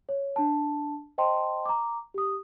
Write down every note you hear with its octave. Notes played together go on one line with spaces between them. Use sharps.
C#5
D4 A5
C5 D#5 G5 A5 C6
A#5 D6
G4 D#6